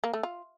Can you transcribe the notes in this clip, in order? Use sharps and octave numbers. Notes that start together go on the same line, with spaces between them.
A#3
A3
F4